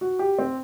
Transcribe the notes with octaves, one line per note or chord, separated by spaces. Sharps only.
F#4
G4
C4